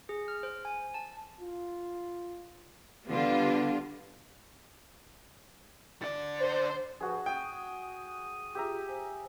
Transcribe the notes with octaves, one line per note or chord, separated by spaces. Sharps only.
G#4
F6
C5
G#5
A5
F4
D3 G3 B3 F4
D3 D5
C5
G2 F3 F#4 G#4
G5 D#6
F4 G4 G#4 E5 A#5
C5 G#5